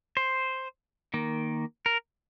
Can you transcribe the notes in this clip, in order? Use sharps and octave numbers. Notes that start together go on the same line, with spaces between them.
C5
D#3 A#3
A#4